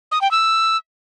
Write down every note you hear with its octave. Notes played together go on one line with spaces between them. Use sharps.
D#6
G5
E6